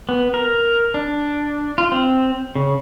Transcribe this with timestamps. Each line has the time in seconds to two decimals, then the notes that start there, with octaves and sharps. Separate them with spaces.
0.09 B3
0.34 A#4
0.94 D4
1.78 F4
1.92 C4
2.55 C#3